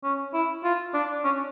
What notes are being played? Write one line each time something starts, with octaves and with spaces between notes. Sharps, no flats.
C#4
E4
F4
D4
C#4